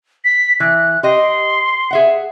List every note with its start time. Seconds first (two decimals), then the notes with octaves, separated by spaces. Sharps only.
0.25 B6
0.60 E3 F#6
1.03 G4 D#5 C6
1.91 G#4 E5 F#5